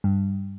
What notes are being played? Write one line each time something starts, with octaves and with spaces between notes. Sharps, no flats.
G2